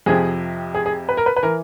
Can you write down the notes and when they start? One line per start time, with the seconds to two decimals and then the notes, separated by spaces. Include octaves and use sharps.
0.06 F2 C3 F3 G#4
0.75 G#4
0.86 G#4
1.09 B4
1.17 A#4
1.26 B4
1.36 B4
1.43 E3 A#4